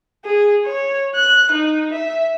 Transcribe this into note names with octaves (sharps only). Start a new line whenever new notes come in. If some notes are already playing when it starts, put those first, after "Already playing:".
G#4
C#5
F#6
D#4
E5